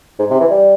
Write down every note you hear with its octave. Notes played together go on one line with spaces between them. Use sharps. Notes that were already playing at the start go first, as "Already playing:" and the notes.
G#2
C3
E3
G3